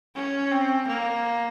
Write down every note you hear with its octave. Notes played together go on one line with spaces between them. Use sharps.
C#4
C4
A#3